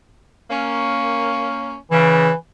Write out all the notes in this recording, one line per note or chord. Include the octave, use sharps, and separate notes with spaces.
A#3 C#4
C#3 E3